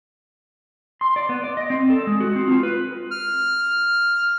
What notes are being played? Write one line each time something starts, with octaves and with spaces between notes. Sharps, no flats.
C6
D5
B3
D5
D#5
C4
A4
G#3
F#4
C4
F4
B4
F6